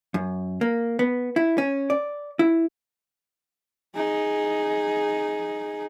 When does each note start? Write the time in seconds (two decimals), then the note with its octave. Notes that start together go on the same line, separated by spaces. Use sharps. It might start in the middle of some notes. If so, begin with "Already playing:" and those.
0.14 F#2
0.61 A#3
0.99 B3
1.36 E4
1.58 C#4
1.90 D5
2.39 E4
3.95 D#4 G#4